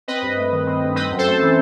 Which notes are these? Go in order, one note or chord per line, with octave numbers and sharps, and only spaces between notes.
C4 B4 D#5
G2
A3
D#3
C4
G2
C4 B4 D#5
F#2
A4 C5
A3
E3